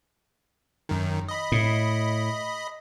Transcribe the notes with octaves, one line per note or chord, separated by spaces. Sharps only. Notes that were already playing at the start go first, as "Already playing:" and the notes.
F#2 D#3
D#5 B5
A2